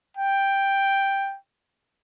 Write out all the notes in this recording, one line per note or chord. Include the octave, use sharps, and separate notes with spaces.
G5